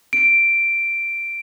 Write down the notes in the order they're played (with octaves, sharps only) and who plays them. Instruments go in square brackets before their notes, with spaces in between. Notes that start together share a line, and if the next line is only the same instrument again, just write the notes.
[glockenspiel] D7